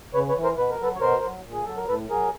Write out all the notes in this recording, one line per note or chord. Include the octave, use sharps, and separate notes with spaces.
C#3 B4 C#5
B4 C#5
E3
A#4 C5
B2 B4
A#4
F#3 A4 B4
C#5
B2 A#4 C5
F#3
A#2
G#4
F#3 A4
A#4
A2 A4 B4
F#3 G#4 A#4